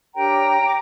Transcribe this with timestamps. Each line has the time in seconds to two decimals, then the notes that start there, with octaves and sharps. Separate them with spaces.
0.15 D4 G4 A#4 C#5 G5 A#5
0.64 D6